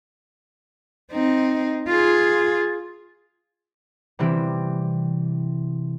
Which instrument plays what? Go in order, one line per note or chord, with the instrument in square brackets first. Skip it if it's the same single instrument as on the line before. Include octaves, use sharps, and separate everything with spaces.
[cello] C4 D#4
F4 G#4
[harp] C3 E3 G3 C4